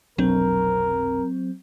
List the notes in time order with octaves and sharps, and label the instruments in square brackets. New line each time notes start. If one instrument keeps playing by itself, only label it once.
[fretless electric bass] F1 B1 D4 [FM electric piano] F#3 C4 [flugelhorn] A#4